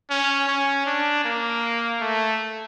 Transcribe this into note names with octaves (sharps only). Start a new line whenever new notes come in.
C#4
C#4
D4
A#3
A3